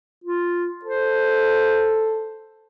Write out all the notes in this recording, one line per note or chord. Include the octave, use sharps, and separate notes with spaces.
F4
A4 C5